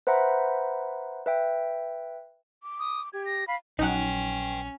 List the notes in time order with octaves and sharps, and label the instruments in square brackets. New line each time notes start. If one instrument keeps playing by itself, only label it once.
[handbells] B4 C5 E5 F#5 A#5 B5
B4 E5 G5
[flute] D6
[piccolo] D#6
[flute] G4 [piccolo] G#6
[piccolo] A#6
[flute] F5 [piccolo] B5
[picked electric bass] A#1 F#3 [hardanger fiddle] C#4 [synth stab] D#4 F#5 [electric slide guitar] B4 G5